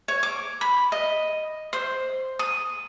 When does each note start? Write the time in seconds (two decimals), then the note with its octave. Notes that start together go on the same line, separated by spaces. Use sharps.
0.08 C#5
0.23 D6
0.61 B5
0.92 D#5
1.73 C5
2.39 D#6